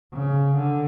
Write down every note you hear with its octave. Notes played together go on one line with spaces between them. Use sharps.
C#3
D3